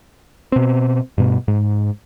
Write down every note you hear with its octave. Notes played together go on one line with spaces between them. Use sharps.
B2 C4
G2 B2
G#2